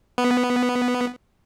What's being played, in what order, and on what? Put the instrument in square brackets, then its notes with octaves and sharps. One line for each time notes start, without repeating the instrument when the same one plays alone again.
[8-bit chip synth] B3